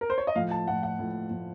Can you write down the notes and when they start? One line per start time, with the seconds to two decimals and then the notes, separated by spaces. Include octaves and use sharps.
0.01 A#4
0.10 C5
0.18 C#5
0.27 D#5
0.35 A2 F3 F5
0.51 A5
0.68 A2 F3 F#5
0.83 F#5
0.99 A2 F3
1.31 A2 F3